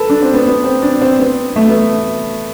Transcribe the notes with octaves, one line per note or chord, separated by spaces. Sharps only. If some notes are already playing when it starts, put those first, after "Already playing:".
Already playing: A4 B4
D4
C4
B3
B3
C4
D4
C4
B3
A3
B3